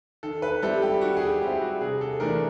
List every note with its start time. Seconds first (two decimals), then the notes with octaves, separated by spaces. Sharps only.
0.23 D#3 A4
0.42 B4
0.63 G3 C4 E4 A4
0.82 G4
1.01 D#3 F#4
1.16 G#4
1.22 G4
1.41 G3 C4 E4 G4
1.62 F#4
1.81 C3 G#4
2.01 A4
2.20 E3 A3 D4 A#4